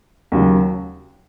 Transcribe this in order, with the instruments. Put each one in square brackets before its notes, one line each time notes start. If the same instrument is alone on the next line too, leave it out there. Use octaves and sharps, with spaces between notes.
[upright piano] D#2 C#3 F#3